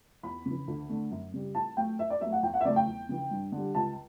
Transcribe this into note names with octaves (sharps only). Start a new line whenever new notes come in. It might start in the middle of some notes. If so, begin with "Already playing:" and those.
E2 B5
C#3
E3
D2
D3 A3
F#2
C#3 G3
A2 A5
F#3 A3 G5
A2 E5
D5
F#3 A3 E5
F#5
E2 G5
F#5
E5
C#3 F#3 A3 D5
G5
E2
C#3 E3
G2
D3
G3
C#2 A5